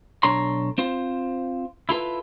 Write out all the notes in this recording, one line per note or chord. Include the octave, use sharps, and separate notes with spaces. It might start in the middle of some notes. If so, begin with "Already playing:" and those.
B1 D4 A4 C#5 A#5 C6
C4 F4 C5
E4 F4 A4 B4